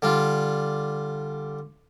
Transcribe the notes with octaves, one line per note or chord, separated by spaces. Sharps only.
D3 G3 F4